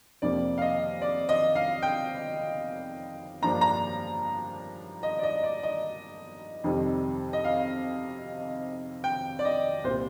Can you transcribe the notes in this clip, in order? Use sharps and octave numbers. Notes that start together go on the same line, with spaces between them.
F2 C3 F3 A#3 D5
F5
D#5
D5
D#5
F5
G5
G2 F3 A#3 D4 A#5
A#5
D#5
D5
D#5
D5
D#5
F2 C3 D#3 G3
D#5
F5
G5
D5
D#5
C2 A#2 G3 C5